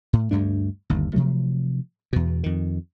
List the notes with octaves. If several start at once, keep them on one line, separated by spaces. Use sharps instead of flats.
A2
D2 G2 A3 D4
G1 D#2
C3 F3 F#3 A3
E2 B2
F2 D#3